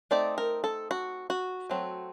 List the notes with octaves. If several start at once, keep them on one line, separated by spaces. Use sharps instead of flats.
A3 C4 D#4 D5
A#4
A4
F#4
F#4
F#3 A3 C4